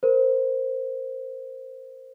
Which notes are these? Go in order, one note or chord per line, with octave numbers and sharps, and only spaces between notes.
A#4 C5